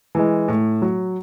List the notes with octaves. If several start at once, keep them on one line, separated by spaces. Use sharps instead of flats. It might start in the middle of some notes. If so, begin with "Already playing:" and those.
E3 G#3
A2
F#3